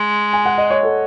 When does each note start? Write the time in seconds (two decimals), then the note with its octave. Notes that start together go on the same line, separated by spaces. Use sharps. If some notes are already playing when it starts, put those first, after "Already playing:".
Already playing: G#3
0.33 G#5
0.46 F#5
0.58 D#5
0.71 C#5
0.83 A4